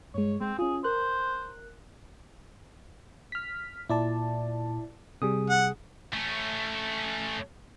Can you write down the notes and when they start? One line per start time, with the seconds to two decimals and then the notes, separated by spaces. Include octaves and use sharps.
0.15 G2 G#3 C#5
0.41 G#3 C4
0.59 C#4 F4 G#4
0.84 A#4 C5 F#6
3.32 F6 B6
3.89 A#2 E4 D5 A5
5.22 C3 G3 G#4 D#6
5.49 F#5
6.13 A3 C#4